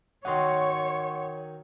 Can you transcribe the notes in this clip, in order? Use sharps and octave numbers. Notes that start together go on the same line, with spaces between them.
D#3 F#3 D#4 C#5 F#5 C6 C#6